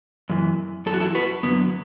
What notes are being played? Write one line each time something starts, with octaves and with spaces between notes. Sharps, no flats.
F#2 E3
F#2 E3 F#4 A4
E4 A4
F#4 B4
F#2 D3 F#3 B3